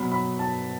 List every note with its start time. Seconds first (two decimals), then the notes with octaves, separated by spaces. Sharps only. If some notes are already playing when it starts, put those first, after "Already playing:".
Already playing: B2 F#3 B3 B5
0.12 B5
0.39 A5